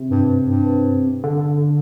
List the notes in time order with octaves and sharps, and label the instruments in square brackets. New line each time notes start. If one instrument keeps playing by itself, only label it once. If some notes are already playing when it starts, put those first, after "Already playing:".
Already playing: [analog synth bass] C3
[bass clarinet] G2
G2
[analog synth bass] D3